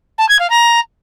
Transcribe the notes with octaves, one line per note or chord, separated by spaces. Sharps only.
A5
G#6
F5
A#5